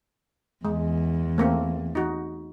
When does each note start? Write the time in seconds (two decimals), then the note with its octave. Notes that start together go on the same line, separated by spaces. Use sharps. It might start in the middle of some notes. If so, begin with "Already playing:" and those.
0.65 E2 G#3
1.38 A3 A#3 C4
1.95 D#4 F#4